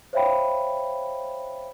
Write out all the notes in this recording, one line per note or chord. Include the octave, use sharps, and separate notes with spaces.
C5 C#5 E5 F5 G5 B5